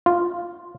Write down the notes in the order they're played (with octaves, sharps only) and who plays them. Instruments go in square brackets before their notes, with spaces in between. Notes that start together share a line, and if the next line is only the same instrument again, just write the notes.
[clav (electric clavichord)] F4